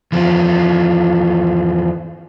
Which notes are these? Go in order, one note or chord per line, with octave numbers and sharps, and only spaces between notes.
E2 F3